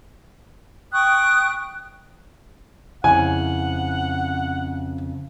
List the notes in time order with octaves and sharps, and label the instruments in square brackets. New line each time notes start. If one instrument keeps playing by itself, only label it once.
[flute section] G5 C#6 D#6 F#6
[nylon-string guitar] F2 C#3 E4 [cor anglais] F#5 [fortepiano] G#5